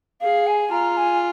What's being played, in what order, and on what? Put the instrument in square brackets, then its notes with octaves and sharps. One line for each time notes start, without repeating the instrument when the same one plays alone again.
[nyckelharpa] G#4 [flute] F5
[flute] G#5
[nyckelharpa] F4 [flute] A#5
[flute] G#5